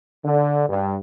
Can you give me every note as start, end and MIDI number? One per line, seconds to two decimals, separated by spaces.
0.24 0.65 50
0.69 0.97 43